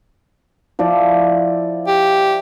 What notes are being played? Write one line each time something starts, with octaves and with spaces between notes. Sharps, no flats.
F3 E4 D5
G4